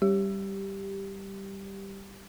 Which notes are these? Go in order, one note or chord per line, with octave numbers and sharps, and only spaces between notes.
G3 G4